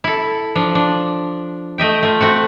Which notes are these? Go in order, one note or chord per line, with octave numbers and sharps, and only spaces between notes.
E4 A4
F3 D4
D4
A3 D#5 E5 G5
A3 F4
A3 C4 F#4